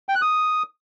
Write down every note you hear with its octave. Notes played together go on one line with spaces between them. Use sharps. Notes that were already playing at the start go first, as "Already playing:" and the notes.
G5
F#6
D#6